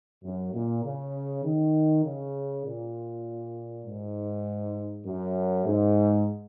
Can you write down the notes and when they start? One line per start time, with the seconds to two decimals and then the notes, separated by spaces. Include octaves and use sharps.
0.23 F#2
0.53 A#2
0.83 C#3
1.44 D#3
2.03 C#3
2.65 A#2
3.85 G#2
5.06 F#2
5.65 G#2